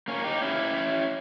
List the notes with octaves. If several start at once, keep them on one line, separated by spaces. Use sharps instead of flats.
A#3 C#4
D#4 G4
C#4 E4